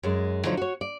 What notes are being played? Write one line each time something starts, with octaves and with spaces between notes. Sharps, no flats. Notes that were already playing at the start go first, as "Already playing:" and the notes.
F#2 G#3
D2 D3 D#3 F3 F#3 D#4
F#4 C#5
D5